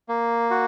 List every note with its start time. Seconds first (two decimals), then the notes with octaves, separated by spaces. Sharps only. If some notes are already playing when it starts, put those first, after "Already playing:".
0.09 A#3
0.50 F#4